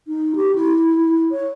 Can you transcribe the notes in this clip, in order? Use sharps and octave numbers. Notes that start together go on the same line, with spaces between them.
D#4
G4
E4
E4
C#5